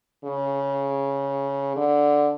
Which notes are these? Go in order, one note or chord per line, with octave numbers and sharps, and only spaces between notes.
C#3
D3